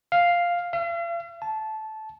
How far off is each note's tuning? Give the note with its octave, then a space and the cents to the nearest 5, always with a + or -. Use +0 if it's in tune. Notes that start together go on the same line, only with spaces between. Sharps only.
F5 +0
F5 -45
A5 -15